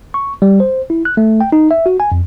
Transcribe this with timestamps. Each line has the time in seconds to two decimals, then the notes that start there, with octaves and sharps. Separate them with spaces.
0.14 C#6
0.42 G3
0.60 C5
0.90 E4
1.05 F#6
1.17 A3
1.41 G5
1.52 D#4
1.71 E5
1.86 F#4
2.00 G#5
2.12 F2